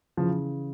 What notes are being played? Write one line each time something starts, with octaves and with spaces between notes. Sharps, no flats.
C#3 E3 F3